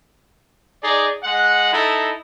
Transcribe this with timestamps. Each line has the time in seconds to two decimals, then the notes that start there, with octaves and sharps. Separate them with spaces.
0.82 D#4 G#4 D5
1.22 G#3 F#5
1.72 D#4 E4 A4